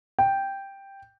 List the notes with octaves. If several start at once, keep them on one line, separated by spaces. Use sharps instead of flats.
G5